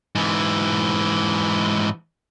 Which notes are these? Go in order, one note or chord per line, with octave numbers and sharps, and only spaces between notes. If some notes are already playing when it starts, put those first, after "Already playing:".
G#2 E3